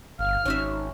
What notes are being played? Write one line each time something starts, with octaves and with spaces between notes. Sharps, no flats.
G1 F5 F6
G#1 C#4 D#4 F#4 E5